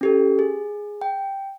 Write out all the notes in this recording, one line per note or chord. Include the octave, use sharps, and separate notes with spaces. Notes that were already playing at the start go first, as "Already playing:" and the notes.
C#4 G4 A4
G#4
G5